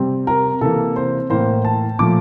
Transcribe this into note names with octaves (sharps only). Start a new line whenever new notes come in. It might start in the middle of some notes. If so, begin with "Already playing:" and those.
Already playing: C3 G3 C4
A#4
C3 E3 A#3 A4
C5
A2 E3 A#3 C5
A5
A#2 F3 A3 D6